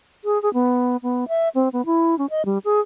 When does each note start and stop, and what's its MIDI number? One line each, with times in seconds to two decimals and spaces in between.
0.24 0.41 68
0.42 0.52 68
0.54 0.97 59
1.03 1.28 59
1.28 1.49 76
1.55 1.69 60
1.73 1.85 59
1.86 2.17 64
2.18 2.26 61
2.30 2.45 75
2.45 2.58 55
2.65 2.80 68